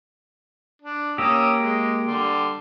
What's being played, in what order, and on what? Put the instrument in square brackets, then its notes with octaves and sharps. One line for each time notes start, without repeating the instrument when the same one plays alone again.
[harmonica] D4
[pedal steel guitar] A#3 G4 [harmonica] C#4 D#6 E6
[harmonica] G#3
D3 G3 C6